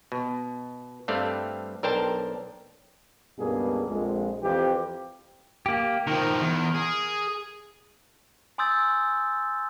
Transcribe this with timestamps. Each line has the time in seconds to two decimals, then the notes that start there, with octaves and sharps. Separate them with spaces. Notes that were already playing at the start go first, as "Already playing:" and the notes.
0.12 B2
1.08 G2 A3 C4 D5 F5
1.83 B1 D4 A#4 C5 G5 A5
3.39 C#2 G2 B2 A#3 G#4
3.89 A#1 F2 G#3
4.42 F2 E3 G4
5.66 A#3 G4
6.07 D#3 F3 A#4
6.41 E2
6.75 G#4
8.58 G#5 C6 D#6 E6 G6 A6